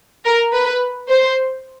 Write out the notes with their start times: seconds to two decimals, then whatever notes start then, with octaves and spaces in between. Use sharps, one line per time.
0.25 A#4
0.53 B4
1.09 C5